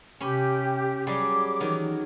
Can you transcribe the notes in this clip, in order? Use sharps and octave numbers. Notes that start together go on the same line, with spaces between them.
C3 C#4 G4 B5
F#3 G3 G#4 D6
D#3 E3 F#3